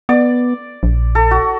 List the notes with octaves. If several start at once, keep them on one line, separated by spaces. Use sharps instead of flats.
B3 D5
A#1
A4
F#4